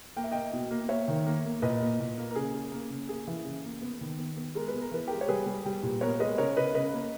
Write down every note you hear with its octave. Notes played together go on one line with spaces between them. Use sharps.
A#3 G5
E5
A#3 D#5 G5
B2
A#3
A#3 C#5 E5
D#3
A#3
A#3
A#2 B4 D#5
A#3
A#2
A#3
A#4
C#3 G#4
C#3
A#3
C#3
A#3 G#4
E3
C#3
A#3
B3
D#3
B3
B3
G#3 A#4
B4
B3
A#4
E3 B4
G#3 G4 A#4
C#5
G3 G#4 B4
G3
G3
A#2
B3 A#4 C#5
G#3 B4 D#5
C#3 A#4 C#5
C#3 B4 D#5
C#3 B4 D#5
A#3